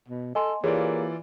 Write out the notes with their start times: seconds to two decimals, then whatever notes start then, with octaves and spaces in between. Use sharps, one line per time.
0.08 B2
0.35 A4 D#5 G#5 C6
0.64 E3 A#3 F4 G4 G#4 C#5 D5